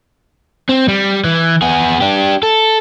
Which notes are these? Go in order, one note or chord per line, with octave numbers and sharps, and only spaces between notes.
C4
G3
E3
B3 G#4
D4 G4
A4